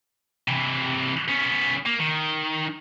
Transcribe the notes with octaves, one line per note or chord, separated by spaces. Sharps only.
C3 E3
B3 C#4
A#3
D#3